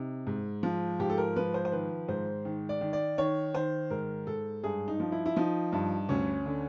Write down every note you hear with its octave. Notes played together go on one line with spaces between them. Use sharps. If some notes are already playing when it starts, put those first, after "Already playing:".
Already playing: C3 D#4
G#2
F3
G#2 G4
A4
A#4
F3 B4
C5
C5
D#3 B4
G#2 C5
D#3
D5
D#3
D5
D#3 C#5
D#3 C5
G#2 A#4
G#2 A4
G2 G#4
D#4
F3
E4
E4
F3 D#4
G2
D2 C#4
D3